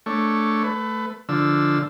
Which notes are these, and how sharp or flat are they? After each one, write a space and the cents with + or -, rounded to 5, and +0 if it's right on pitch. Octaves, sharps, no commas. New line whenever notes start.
A3 +0 D4 +0 C#5 +0
A3 +0 B4 +20
D3 +0 F3 +0 E6 +0